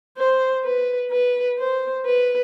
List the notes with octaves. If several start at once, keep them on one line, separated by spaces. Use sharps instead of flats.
C5
B4
B4
C5
B4